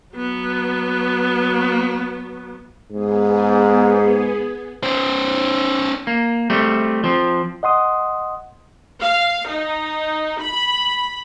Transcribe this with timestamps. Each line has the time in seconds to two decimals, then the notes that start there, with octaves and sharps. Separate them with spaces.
0.15 F#3 B3
2.92 G#2 B3 G#4
4.83 C#4 C5
6.07 A#3
6.50 G3 A3 C4
7.04 F3 C4
7.63 D#5 F#5 C6 D#6
9.02 F5
9.50 D#4
10.42 B5